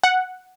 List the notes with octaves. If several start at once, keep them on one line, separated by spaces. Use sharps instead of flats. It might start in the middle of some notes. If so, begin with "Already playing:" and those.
F#5